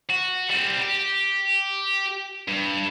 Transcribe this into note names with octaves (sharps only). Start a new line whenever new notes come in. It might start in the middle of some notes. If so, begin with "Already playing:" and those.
F#4
G3 C4
G4
G2